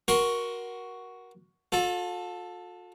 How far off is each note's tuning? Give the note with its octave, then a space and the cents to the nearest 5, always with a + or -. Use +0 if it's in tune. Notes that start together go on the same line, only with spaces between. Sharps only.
F#4 +5 A#4 +20 C6 +0
F4 +45 A4 +0